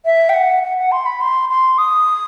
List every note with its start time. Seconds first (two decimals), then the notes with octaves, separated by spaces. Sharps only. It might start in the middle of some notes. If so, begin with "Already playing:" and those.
0.05 E5
0.29 G5
0.34 F#5
0.63 F#5
0.77 F#5
0.92 C6
1.06 B5
1.21 C6
1.50 C6
1.78 D#6